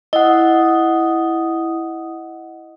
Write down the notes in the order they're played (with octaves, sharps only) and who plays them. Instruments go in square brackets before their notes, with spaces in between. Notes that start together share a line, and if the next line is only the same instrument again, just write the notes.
[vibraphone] E4 D#6 [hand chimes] D#5 F#5